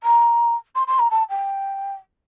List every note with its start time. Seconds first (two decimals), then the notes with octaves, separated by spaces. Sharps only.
0.03 A#5
0.75 C6
0.87 C6
0.99 A#5
1.10 A5
1.29 G5